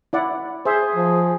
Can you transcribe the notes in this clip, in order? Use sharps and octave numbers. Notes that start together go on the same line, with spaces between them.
E4 D5 F#5
G#4 C5 E5
F3